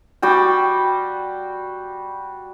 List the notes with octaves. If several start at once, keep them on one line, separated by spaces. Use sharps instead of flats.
G3 F#4 G5